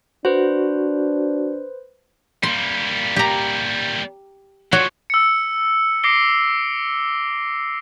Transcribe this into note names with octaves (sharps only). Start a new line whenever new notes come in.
D4 F#4 B4 C5
G3 A#3 C6
G4 A#5
F3 F#3 F#4 C#5
E6 C#7
D6 D#6 A#6 C7 D7 G7